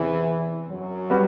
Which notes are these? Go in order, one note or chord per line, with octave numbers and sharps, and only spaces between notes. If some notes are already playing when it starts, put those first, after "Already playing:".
Already playing: E2 C3 E3 C4
F#2 F#3
G3 B3 F#4 B4